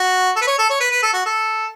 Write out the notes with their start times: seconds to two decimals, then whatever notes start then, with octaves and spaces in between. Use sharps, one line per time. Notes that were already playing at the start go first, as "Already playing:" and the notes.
Already playing: F#4
0.36 A4
0.41 B4
0.47 C#5
0.59 A4
0.70 C#5
0.80 B4
0.91 B4
1.03 A4
1.13 F#4
1.26 A4